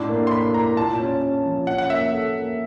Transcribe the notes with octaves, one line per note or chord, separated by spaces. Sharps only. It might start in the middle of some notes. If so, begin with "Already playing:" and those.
Already playing: A2 D4 C6
A#3
C6
A#3 B5
A#3 A#5
A#2 A5
C#4
C#4
F3
C#4 F#5
F#5
A#3 E5
A4
A#3